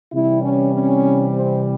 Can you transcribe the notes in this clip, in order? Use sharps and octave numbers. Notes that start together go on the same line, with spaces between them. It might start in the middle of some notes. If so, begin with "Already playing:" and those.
C3 E3 G3 E4
C#4
C#4
C4